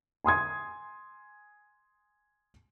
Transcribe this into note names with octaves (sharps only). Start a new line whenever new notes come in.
G#5 C6 D#6 G#6